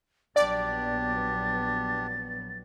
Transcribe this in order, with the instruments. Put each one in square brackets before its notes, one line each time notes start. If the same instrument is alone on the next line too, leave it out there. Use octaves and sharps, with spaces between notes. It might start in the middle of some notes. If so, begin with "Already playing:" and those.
[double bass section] A#1 F#3 B3 [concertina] D4 G4 [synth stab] D5 [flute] A6